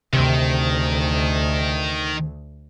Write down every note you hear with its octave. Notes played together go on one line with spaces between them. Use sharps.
D2 C3 D#3